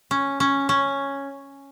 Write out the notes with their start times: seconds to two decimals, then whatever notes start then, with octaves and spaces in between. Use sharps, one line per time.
0.11 C#4
0.40 C#4
0.69 C#4